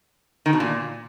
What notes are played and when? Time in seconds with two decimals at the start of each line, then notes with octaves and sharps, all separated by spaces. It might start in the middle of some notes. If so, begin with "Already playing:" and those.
0.46 D#3
0.53 B2
0.60 A#2